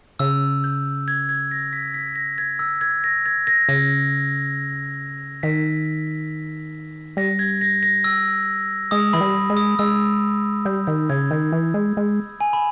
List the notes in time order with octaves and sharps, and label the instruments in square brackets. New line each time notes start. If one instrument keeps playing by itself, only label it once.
[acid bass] C#3 [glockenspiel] E6
[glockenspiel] G6
G#6
G#6
A#6
B6
B6
A#6
G#6
E6
G#6
A#6
G#6
A#6
[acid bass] C#3
[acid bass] D#3 [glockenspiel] B6
[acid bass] G3 [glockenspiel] A#6
[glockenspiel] G#6
A#6
A#6
E6
[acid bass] G#3 [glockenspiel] D#6
[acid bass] E3 [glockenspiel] B5
[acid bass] G3
G#3
[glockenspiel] D#6
[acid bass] G#3 [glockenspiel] E6
[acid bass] G3 [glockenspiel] G6
[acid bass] D#3 [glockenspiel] G6
[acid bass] C#3 [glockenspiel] G#6
[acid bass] D#3 [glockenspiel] G6
[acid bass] E3
G#3
G#3
[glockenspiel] G#5
B5